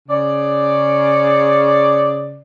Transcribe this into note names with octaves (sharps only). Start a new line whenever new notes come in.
C#3 D5